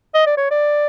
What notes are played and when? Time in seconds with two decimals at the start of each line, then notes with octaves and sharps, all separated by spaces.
0.15 D#5
0.26 D5
0.38 C#5
0.51 D5